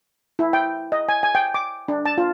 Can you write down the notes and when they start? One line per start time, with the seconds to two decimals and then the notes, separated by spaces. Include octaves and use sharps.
0.39 E4
0.53 G5
0.92 D#5
1.09 G#5
1.23 G#5
1.35 G5
1.54 D6
1.88 D4
2.06 A5
2.18 F4